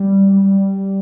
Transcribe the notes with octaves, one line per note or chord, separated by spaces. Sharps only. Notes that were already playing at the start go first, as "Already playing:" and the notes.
Already playing: G3
G3